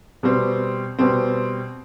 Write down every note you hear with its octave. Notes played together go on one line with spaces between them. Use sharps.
B2 G3 C4
B2 G3 C4